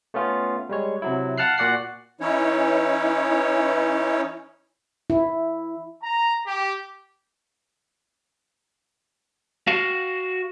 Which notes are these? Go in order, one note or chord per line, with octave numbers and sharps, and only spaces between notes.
A3 B3 C#4 F4
G3 G#3 C#5
C3 F#3 E4
F5 F#5 A5 F6 F#6 C7
A#2 F#4 D5 F#5 F#6 C7
E3 C#4 D#4 E4 C#5
E4
A#5
G4
F#4 F5